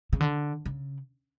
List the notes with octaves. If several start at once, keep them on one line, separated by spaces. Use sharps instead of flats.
C#3
D3
C#3